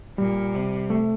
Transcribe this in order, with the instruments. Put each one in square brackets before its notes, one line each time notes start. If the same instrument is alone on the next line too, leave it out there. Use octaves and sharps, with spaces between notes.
[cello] A#2 [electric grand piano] G3
[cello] C3
[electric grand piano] A3